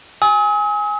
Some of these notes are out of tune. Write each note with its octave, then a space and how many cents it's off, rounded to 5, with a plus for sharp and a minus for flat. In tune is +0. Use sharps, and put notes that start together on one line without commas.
G#5 +0 D#6 +45